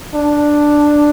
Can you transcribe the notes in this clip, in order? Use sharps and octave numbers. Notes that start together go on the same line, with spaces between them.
D4